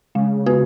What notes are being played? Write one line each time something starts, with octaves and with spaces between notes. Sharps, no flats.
C#3 G#3
B3 F#4 B4